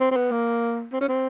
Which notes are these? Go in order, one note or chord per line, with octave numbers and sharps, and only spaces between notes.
C4
C4
B3
A#3
C4
C#4
C4